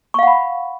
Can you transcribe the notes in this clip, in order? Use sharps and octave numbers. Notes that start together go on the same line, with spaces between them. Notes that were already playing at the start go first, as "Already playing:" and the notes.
F5 F#5 B5 C#6